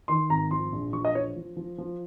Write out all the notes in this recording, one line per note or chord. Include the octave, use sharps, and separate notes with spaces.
D#3 C6
G#1 A#5
F3 C6
A#1
F3 C#6
D#5
F3 C#5
F3
F3
F3